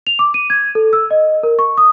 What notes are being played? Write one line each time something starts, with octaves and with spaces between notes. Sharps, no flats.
F7
D6
D#7
G#6
A4
E6
D#5
A#4
C#6
D#6